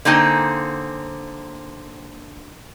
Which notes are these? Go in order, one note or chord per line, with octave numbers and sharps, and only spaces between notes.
D3 A#3 C4 D#4 G#5